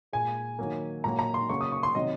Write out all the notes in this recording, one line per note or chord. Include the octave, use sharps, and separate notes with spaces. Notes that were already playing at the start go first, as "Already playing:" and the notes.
A#2 G#3 G#5
D#3 F#3 A#3
A#2 F#3 A#3 A#5
A#5
C6
C#3 F#3 A#3 C#6
D#6
C#6
C6
C3 D#3 F#3 D#5